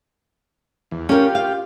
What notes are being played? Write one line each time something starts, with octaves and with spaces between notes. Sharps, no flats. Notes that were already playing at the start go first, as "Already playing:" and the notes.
E2
C#4 F4 G4 A#4
F5